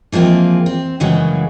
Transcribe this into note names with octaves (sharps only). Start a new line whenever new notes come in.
E3 F3 G#3 A#3 C4
C4
F#2 C#3 E3 F#3 G#3